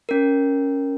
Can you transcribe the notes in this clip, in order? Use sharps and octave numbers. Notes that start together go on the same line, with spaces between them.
C#4 A#4